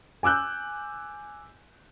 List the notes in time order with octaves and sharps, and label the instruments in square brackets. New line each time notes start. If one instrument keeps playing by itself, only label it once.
[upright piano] G#5 D6 E6 F#6 G6